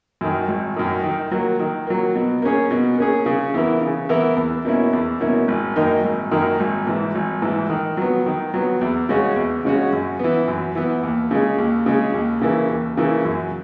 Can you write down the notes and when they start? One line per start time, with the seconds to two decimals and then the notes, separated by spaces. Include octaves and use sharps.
0.21 F#2 D#3
0.48 G#1
0.76 F#2 D#3
1.03 D#3
1.31 F#3 A#3
1.59 D#3
1.87 F#3 A#3
2.15 B2
2.42 A#3 C#4 G#4
2.71 B2
2.98 A#3 C#4 G#4
3.26 C#3
3.54 E3 B3 E4 A#4
3.82 C#3
4.09 E3 B3 E4 A#4
4.37 E2
4.65 B2 A#3 C#4 E4
4.93 E2
5.20 B2 A#3 C#4 E4
5.48 G#1
5.76 F#2 D#3 A#3 D#4
6.04 G#1
6.31 F#2 D#3 A#3 D#4
6.60 G#1
6.87 G#2 E3
7.15 G#1
7.42 G#2 E3
7.70 D#3
7.97 F#3 B3
8.26 D#3
8.54 F#3 B3
8.81 E2
9.09 C#3 G#3 C#4 F#4
9.36 E2
9.65 C#3 G#3 C#4 F#4
9.93 F#2
10.19 E3 B3
10.48 F#2
10.75 E3 B3
11.03 D#2
11.31 C#3 G#3
11.58 D#2
11.86 C#3 G#3
12.14 D#2
12.41 C#3 E3 A#3
12.70 D#2
12.97 C#3 E3 A#3
13.25 F#2